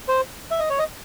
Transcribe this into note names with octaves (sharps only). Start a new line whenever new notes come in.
C5
E5
D#5
C#5
D#5